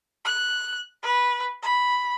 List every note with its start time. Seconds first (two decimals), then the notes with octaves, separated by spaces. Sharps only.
0.25 F#6
1.03 B4
1.62 B5